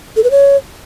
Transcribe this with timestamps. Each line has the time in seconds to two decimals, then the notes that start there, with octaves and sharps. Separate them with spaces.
0.16 A4
0.24 B4
0.31 C#5